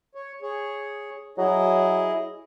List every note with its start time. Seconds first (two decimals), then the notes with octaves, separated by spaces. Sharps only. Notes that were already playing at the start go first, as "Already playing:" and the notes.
0.15 C#5
0.42 G#4 C#5
1.38 F#3 E4 G#4 D#5